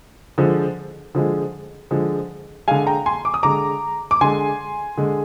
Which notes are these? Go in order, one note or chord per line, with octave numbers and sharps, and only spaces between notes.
D3 F3 G#3
D3 F3 G#3
D3 F3 G#3
D3 G#3 F5 G#5
G5 A#5
G#5 C6
D6
D#6
D3 G#3 A#5 D6
D6
D3 G#3 G#5 C6
D3 G#3